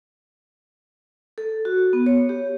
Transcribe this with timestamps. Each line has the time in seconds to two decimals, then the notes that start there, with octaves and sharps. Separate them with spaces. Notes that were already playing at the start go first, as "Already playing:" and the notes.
1.38 A4
1.65 F#4
1.93 B3
2.06 C#5
2.29 G4